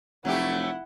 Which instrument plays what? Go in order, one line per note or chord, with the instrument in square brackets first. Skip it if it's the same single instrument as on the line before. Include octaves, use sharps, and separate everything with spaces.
[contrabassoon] F1 [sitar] F#3 A3 G4 [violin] E4 F#5